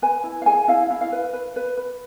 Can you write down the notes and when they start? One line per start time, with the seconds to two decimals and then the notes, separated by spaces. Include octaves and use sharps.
0.02 B4 G#5
0.24 E4
0.42 F5
0.46 G#4 G#5
0.68 E4 F5
0.90 E4
1.01 F5
1.12 B4
1.33 B4
1.56 B4
1.77 B4